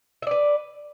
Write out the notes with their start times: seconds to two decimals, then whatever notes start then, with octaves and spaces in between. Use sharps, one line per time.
0.22 E5
0.27 D5
0.31 B4